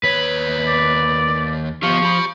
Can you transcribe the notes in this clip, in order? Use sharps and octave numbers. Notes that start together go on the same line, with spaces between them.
D#2 B4 C#5
D5
F3 B3 F4 G4 C#6
G4 B5